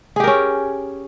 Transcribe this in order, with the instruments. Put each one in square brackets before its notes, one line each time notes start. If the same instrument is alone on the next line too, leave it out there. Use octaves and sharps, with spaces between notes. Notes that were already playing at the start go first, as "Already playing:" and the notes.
[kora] G#4
G4
A#4
C#4